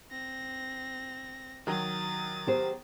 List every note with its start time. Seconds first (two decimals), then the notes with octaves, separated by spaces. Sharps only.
0.11 C4 A#6
1.67 D#3 F#3 D#6 A6
2.47 B3 G4 C5